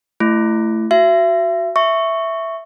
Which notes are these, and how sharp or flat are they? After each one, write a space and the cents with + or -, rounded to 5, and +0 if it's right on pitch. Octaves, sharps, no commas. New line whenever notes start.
A3 +0 E4 +20
F#4 +5 E5 +35
E5 +0 C#6 +0